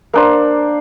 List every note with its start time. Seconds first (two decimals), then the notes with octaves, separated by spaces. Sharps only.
0.13 A#3 D4 C5